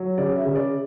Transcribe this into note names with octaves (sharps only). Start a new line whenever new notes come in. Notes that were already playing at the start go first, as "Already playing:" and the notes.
Already playing: F#3
C#3 D5
E5
C#3
D5